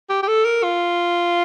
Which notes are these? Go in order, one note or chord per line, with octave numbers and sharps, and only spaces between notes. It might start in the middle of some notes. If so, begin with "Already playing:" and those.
G4
G4
A4
A#4
F4